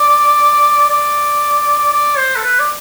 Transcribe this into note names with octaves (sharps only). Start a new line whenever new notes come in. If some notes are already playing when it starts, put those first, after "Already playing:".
Already playing: D5
D5
D5
C5
A4
B4
D5